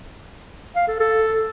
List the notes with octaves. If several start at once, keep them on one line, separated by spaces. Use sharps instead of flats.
F5
A4
A4